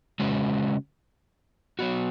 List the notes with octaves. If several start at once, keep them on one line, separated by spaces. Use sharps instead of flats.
C#3 G#3 C#4 F#4 B4
F#3 B3 F#4